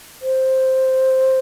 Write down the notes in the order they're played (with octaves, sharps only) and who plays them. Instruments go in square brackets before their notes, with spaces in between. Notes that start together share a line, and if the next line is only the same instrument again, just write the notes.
[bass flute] C5